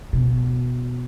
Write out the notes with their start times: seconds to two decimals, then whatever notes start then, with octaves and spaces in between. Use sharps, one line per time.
0.13 B2